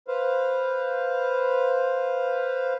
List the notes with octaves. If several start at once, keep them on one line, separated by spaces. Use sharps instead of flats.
B4 C5 F5